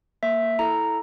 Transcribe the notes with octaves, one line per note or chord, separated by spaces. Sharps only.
A#3 E5
E4 A4 A#5